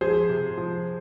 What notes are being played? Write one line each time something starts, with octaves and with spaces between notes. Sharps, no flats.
F3 G#4 C5
C3
F3